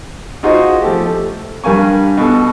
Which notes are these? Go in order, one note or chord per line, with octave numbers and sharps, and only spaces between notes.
D#4 F4 F#4 G#4 C5 D#5
F3 A3 G4
A3
G2 G3 A#4 F5 G#5 C#6
B2 A4